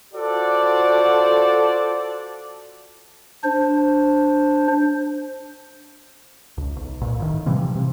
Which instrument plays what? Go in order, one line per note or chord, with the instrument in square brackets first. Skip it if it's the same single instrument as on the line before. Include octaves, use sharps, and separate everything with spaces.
[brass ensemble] F4 F#4 A4 C5 D5 F#5
[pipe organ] D4 C5
[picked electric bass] C#2
B1
D1 A#2
A2 D#3
C3 E3 F3 G3
C3